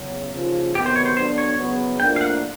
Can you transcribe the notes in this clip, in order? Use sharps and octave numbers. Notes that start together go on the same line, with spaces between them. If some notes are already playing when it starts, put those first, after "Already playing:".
Already playing: E2 C#3 F#3
D#2 C#3 F3
F2 C3 D#3 F#3 B3 G4
C5
C#5
C5
D3 F#3 B3 D4 C5
C#5
E2 C#3 F#3 B3
A2 F3 A#3 D4 G5
F5
F#5